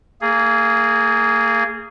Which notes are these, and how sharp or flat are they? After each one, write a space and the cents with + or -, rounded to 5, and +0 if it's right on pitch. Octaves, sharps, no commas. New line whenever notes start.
A#3 -30 G#4 +0